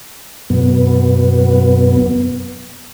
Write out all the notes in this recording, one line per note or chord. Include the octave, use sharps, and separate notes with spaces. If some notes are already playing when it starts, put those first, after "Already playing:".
F#2 B2 B3